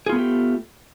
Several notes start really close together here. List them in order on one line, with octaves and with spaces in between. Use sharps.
G#4 F4 B3 A3 G4